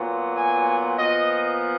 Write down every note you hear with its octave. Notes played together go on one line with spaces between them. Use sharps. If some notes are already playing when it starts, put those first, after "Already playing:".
Already playing: A#2 F#3 B3
G#5
A#2 F3 B3 D#5